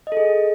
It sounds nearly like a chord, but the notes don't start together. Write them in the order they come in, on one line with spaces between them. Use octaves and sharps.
D#5 A4 G#4